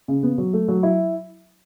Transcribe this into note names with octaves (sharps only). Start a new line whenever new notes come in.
C#3
B3
F#3
A3
F#3
E4